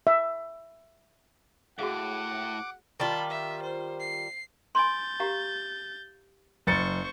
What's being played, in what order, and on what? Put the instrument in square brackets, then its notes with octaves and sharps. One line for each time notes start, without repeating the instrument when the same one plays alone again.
[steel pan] E5
[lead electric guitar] A2 [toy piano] F#4 G#4 F5 [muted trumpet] F#5 [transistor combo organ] D6
[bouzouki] D#3 G3 F4 [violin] A5 B5
[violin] E5
C5
C7
[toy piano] G#5 B5 C6 [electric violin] G6 A6
[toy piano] G4 F5 A#5
[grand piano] F#1 A6 C#7 [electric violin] C5 C#6